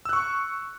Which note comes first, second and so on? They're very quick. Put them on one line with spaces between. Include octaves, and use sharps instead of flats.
E6 F#6 C#6